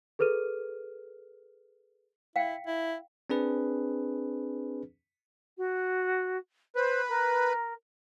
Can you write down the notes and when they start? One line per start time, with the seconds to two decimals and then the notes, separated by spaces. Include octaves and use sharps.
0.19 G#4 A4 B4 F6 D#7
2.36 E4 F5 G5
2.67 E4
3.30 C4 D4 G#4 B4
5.57 F#4
6.76 B4 C5
7.09 A#4